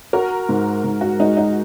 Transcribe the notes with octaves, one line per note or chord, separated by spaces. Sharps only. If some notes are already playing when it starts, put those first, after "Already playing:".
F#4 A#4
G#2
G#2
F#4
G#3 D#4
D#4